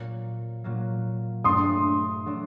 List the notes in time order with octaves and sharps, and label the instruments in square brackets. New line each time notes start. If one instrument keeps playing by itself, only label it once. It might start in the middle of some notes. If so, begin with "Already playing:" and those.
Already playing: [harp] A#2 F#3 A#3
A#2 F#3 A#3
[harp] G2 F#3 A3 D4 [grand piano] C6 D#6
[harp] F#3 A3 D4